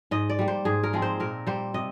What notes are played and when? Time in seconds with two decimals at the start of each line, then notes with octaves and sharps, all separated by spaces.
0.11 G#2 D#5
0.30 D5
0.39 G3 A#3
0.48 C5
0.65 G#2 G#4
0.83 A#4
0.93 F3 G#3 C4
1.02 C5
1.20 A#2 A#4
1.47 G3 A#3 C5
1.74 C3 D#5